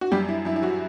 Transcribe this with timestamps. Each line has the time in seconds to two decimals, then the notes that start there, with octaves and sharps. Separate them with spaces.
0.01 F#4
0.12 F#2 G3 G4
0.29 E4
0.45 F#2 E4
0.56 E4
0.62 F#3 F#4